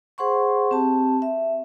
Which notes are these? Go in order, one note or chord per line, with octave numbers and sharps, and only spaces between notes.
G#4 C5 F#5 C6 C#6
C4 G4 A5
E5